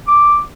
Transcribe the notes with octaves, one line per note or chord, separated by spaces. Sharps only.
D6